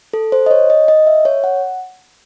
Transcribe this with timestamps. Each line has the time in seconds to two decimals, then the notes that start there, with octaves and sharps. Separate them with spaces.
0.13 A4
0.32 C5
0.46 D#5
0.51 C#5
0.70 D#5
0.88 D#5
1.07 E5
1.25 C#5
1.44 F#5